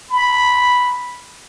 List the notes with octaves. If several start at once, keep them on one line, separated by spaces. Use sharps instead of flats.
B5